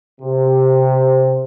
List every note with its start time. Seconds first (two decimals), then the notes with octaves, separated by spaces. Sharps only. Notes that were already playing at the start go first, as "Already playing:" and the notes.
0.21 C3